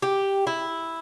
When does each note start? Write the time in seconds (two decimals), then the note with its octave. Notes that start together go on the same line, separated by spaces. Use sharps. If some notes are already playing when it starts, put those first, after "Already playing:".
0.02 G4
0.47 E4